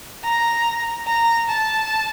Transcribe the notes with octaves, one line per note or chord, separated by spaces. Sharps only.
A#5
A#5
A5